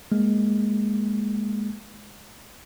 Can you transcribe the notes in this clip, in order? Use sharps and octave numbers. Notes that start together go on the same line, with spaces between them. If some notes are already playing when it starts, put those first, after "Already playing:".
G#3 A#3